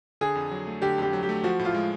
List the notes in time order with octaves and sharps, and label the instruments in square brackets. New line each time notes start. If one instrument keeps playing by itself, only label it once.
[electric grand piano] D3 [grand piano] G#4
[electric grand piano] F2
F#3
A3
[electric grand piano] D3 [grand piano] G4
[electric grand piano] F2 [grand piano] G4
[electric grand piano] F#3
[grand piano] G4
[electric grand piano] A3
[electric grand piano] F3 [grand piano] F#4
[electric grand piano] A2
[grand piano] F4
[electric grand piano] G#3